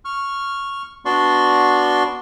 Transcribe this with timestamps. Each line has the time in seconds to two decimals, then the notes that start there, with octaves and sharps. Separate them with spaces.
0.05 C#6 F6
1.05 B3 D4 F#4 D5 C6 C#6